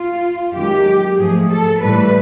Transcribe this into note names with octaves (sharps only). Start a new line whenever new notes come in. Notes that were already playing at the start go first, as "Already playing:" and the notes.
Already playing: F4
F#2 D#3 G#3 G4
G#2 F3 A3 G#4
A4
A2 E3 G3 B4